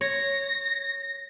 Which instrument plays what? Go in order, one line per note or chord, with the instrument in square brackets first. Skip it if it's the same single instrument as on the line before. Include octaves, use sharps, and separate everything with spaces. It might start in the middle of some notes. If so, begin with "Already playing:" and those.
[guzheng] C#5 [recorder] A#6